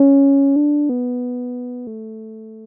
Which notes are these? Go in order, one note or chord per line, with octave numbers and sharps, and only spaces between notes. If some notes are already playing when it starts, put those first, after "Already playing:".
Already playing: C#4
D4
B3
A3